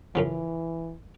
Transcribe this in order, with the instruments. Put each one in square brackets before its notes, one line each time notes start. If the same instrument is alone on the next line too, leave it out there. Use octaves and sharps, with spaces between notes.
[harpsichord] F#2 C#3 F3 [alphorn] E3